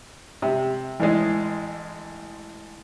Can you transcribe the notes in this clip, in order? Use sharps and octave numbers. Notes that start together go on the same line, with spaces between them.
C3
A1 E3 G#3